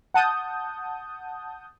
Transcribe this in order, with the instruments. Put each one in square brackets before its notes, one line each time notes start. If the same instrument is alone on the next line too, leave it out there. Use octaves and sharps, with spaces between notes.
[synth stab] F#5 A5 D#6 G6